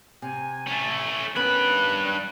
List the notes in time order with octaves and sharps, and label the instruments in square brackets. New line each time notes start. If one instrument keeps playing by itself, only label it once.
[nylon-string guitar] C3 [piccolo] G#5
[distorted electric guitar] A3 C#4
[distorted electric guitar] G2 B5 [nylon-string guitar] D#3 B3 C#4 [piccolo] F#6